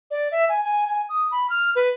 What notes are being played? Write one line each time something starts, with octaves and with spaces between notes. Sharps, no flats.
D5
E5
G#5
G#5
G#5
D#6
B5
F6
B4